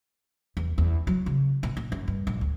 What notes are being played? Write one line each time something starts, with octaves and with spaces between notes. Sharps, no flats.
E2
E2
F#3
C#3
A#2
A#2
F#2
G2
A#1
D2